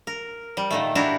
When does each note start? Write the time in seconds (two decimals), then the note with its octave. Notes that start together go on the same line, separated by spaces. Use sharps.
0.07 A#4
0.57 G3
0.71 A#2 D#3 A3
0.95 D4 E4 F#4 G4 A#4